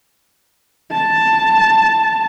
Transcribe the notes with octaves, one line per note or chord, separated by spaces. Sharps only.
A5